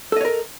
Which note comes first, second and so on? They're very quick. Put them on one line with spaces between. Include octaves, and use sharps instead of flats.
A4 D#5 C#5 A#4